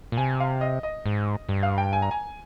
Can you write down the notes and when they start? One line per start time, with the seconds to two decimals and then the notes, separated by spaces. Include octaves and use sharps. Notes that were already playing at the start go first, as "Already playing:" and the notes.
0.12 A#2
0.17 C3 G#5
0.40 F5
0.61 D#5
0.83 D#5
1.06 G#2
1.49 G2
1.63 F5
1.78 G5
1.93 G#5
2.02 A#5
2.11 G#5